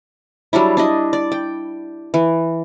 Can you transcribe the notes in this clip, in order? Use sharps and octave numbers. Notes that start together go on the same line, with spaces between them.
F#3 G3 D4 E4
D4 E4 D#5
D5
G5
E3